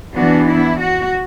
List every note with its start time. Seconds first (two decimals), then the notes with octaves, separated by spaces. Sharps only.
0.15 E3 B3 D4 F#4
0.47 E4
0.79 F#4